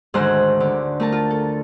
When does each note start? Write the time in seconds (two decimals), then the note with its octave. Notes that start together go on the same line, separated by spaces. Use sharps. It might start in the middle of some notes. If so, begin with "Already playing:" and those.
0.14 D2 G#2 D#3 G#4 C5 F#6
0.60 D3
1.00 A3 A#4 A5
1.12 F4
1.30 A4